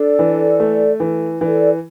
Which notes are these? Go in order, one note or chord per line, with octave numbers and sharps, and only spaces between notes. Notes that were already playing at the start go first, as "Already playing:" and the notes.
Already playing: D4 A4 D5
E3
A3
E3
E3 A4 D5